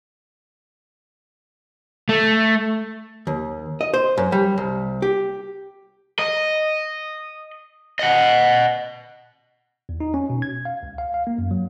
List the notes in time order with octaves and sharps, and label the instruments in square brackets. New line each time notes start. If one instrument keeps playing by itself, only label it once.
[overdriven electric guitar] A3
[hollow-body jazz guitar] D#2
D#5
C5
F#2
G3
C2
G4
[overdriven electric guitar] D#5
D#5 F#5
[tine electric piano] E2
D#4
C#4
B2
G#6
F5
C#2
F5
F5
A#3
F#2
F#3